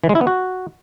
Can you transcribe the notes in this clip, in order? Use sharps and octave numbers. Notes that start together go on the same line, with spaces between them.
E3
G#3
E4
B3
F#4